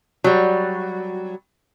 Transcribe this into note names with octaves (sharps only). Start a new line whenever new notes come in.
F#3 G3